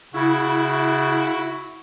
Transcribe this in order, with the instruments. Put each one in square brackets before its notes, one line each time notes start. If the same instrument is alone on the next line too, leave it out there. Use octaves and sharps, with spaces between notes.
[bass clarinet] C#3 [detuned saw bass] E4 [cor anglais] F#4